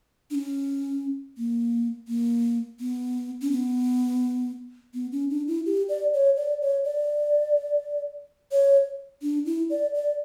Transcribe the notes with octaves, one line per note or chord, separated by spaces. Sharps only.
D4
C#4
A#3
A#3
B3
C#4
B3
B3
C#4
D4
E4
G4
D5
C#5
D5
C#5
D5
C#5
D4
E4
D5
D5